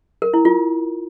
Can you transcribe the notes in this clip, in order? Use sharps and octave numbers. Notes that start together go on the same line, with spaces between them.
A#4
E4
F4